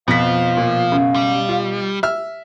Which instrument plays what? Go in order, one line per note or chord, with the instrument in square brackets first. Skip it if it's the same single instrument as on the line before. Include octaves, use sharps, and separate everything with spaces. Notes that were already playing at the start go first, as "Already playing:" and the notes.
[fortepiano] F2 [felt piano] B2 B6 [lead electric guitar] F3 [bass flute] F5
[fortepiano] A#2
F#2 C#3
[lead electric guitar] G3
[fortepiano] F4
E5 F6